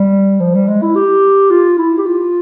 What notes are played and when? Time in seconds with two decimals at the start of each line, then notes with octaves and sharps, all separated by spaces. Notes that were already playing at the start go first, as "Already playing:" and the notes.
Already playing: G3
0.40 F3
0.55 G3
0.68 G#3
0.82 E4
0.96 G4
1.51 F4
1.78 E4
1.98 G4
2.07 F4